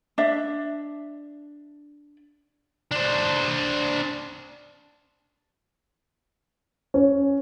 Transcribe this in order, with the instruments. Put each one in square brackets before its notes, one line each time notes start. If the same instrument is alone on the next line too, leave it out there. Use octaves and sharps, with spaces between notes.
[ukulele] D4 E5
[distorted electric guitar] D4 C5
[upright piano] C#4